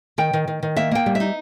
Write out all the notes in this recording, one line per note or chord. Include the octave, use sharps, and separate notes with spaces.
D#3 G5
D#3
D#3
D#3
A#3 E5
A#3 G5
G3
D#4 E5